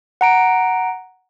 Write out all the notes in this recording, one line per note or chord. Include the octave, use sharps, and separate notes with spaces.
F#5 A#5 D7